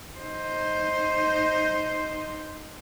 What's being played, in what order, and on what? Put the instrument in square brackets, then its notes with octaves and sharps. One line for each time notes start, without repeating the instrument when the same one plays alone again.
[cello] D#4 C5